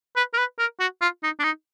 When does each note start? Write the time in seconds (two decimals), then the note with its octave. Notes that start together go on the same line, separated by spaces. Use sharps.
0.16 B4
0.34 A#4
0.38 B4
0.59 A#4
0.80 F#4
1.01 F4
1.23 D#4
1.39 D4
1.44 D#4